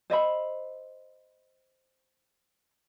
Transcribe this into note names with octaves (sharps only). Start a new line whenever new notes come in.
C5 D#5 E5 B5